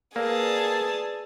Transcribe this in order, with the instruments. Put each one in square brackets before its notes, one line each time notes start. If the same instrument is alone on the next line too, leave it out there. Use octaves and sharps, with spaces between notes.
[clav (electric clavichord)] A#3 [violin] G#4 A5 [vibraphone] B4 D5 E6